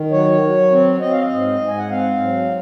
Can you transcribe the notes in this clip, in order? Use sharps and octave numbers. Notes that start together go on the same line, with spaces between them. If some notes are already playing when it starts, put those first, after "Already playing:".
Already playing: D#3
F#3 C#5
F#3
C4
C4 D#5
F5
D#5
G#2
G#2
G#5
F#5
C4 F5
F#3